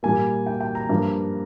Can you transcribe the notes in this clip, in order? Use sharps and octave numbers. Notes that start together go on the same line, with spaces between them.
A#2 G3 A#3 G#5
G5
G5
A#5
G2 F3 A#3